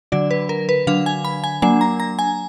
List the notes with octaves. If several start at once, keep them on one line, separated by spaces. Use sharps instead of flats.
D3 F#3 D4 D5
B4
A#4
B4
D3 F#3 D4 F5
G#5
B5
G#5
F#3 A#3 D4 G#5
A#5
A#5
G#5